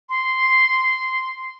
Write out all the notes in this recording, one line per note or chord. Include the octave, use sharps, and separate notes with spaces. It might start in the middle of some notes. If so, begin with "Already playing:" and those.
C6